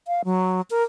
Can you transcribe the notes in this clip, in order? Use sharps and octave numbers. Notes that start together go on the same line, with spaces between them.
F5
F#3
A#4